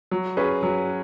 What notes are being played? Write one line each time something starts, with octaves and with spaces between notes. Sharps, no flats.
F#3
C#4 G#4 B4
F#3